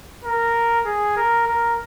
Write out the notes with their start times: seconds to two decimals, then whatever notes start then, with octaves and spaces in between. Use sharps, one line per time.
0.24 A#4
0.85 G#4
1.16 A#4
1.47 A#4